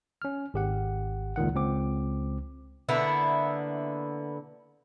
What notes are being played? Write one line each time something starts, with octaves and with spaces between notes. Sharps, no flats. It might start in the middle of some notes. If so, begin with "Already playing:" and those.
C#4 F6
G#1 G4 F#5
C#2 A#2 D#3 F#5
C#2 C4 D6
D3 A#3 B3 E4